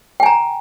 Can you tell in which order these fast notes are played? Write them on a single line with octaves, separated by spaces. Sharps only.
G5 G#5 A#5